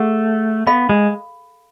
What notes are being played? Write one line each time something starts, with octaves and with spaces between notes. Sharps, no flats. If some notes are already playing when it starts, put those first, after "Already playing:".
Already playing: A3 G#4 F#5
B3 A4 F5 B5
G#3